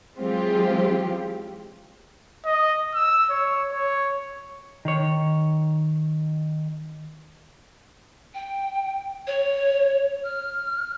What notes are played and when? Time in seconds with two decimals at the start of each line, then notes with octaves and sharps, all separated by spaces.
0.16 E3 F#3 G#3 C4 F4 G4
2.45 D#5
2.95 E6
3.30 C#5
3.72 C#5
4.85 D#3 C#5
8.34 G5
9.27 C#5
10.24 F6